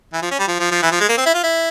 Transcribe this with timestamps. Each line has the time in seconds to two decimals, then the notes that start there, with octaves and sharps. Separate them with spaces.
0.13 E3
0.22 F3
0.31 C#4
0.39 G3
0.48 F3
0.60 F3
0.71 F3
0.82 E3
0.91 F3
1.00 G#3
1.09 A#3
1.17 C4
1.26 E4
1.34 F4
1.43 E4